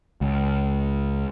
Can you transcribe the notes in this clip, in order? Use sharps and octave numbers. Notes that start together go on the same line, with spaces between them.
C#2